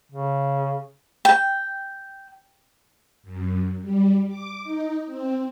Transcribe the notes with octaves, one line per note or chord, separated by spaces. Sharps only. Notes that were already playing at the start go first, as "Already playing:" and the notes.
C#3
G5
F#2
G3
D6
D#4
C4